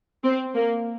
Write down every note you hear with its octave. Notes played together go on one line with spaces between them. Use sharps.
C4
A#3